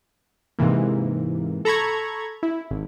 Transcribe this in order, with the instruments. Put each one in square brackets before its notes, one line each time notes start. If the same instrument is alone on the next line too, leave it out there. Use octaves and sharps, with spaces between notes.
[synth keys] G#2 C3 E3 A#3
A4 A#5 B5 C#6 G#6
E4
G#1